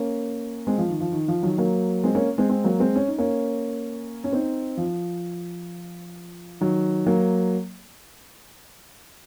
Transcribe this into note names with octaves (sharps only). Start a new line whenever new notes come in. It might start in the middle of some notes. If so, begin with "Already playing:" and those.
Already playing: A#3 C#4
G#3 C4
F3
D#3
F3
D#3
F3
D#3 F#3
F#3 A#3
G#3 C4
A#3 C#4
G#3 C4
G#3 C4
F#3 A#3
G#3 C4
C#4
D#4
A#3 C#4
C#4
C4 D#4
F3
D#3 F#3
F#3 A#3